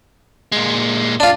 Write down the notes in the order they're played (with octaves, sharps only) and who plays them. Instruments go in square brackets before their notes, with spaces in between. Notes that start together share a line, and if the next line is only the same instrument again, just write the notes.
[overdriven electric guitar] A#2 G#3
[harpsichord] D4 F4